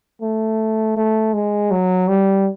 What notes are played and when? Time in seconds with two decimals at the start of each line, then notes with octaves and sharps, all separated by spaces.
0.21 A3
0.97 A3
1.34 G#3
1.71 F#3
2.08 G3